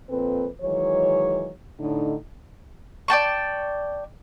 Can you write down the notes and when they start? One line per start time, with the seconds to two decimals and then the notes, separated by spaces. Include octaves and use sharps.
0.10 F2 A#2 C4 A4 B4
0.62 D#3 E3 F#3 G#3 C#5
1.80 A2 D3 D#4
3.08 D5 G5 A5 C#6